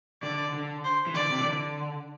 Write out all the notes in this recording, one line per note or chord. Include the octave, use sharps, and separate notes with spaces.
D3 D5
D3
C5
E3
D3 D5
C3
E3
D3